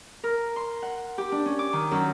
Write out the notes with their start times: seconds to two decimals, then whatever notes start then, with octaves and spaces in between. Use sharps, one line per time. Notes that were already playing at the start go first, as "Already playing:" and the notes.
0.24 A#4
0.56 C6
0.82 F#5
1.18 G4
1.32 D4
1.46 C#4
1.59 D6
1.73 D#3
1.91 F#2